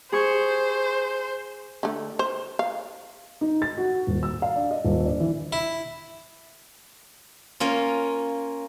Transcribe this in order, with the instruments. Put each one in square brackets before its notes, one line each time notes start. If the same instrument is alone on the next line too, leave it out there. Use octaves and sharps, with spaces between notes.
[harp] G#4 C#6 [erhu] C5
[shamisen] D3 A3
C5
F5
[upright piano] D#4
A6
F#4
D#1
E6
F5
D4
D#5
D#1
D4
E3
[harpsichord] E4
[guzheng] A#3 C#4 F4